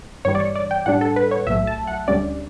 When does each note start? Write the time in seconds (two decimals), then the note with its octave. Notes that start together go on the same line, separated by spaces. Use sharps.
0.25 G2 E3 G3 C#5
0.35 D5
0.40 C#5
0.55 D5
0.71 G5
0.86 A2 G3 D4 F#5
1.01 A4
1.16 B4
1.31 C#5
1.47 B1 A2 F#3 A3 E5
1.67 A5
1.87 F#5
2.08 D2 D3 G3 C#4 D5